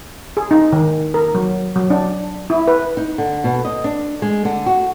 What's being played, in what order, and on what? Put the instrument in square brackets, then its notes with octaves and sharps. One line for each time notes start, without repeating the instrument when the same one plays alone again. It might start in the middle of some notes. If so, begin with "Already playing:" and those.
[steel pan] G#4
D#4
D#3
A#4
F#3
F#3
D4
E4
B4
[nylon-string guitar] D#4
D3
B2
D#5
D4
G#3
D3
F#4